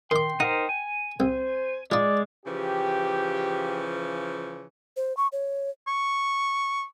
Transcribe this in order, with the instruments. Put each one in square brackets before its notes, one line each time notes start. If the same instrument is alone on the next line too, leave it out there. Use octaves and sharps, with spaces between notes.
[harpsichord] D#3 D6 [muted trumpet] G5 [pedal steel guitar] C6
[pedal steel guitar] D#4 A#4 C5 [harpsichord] F#5
[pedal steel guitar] G#5
[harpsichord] C2 [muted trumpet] C5
[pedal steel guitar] G#3 [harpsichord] D#4 F4 [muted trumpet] D5
[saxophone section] C#3 E3 F3 [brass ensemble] G4
[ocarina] C5
C#6
C#5
[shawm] C#6